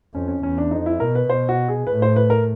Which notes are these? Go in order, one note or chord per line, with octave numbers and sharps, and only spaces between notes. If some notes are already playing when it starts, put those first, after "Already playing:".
F2 C#4
C#4
E2 C#4
D4
F2 D#4
E4
B2 A#4
B4
B2 C5
F#4
G#4
A2 B4
C5
B4
A#4